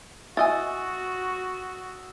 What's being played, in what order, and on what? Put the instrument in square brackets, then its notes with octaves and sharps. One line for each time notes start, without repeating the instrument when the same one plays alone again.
[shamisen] E4 D#5 G#5 [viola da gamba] F#4 [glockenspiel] D#6 E6 A6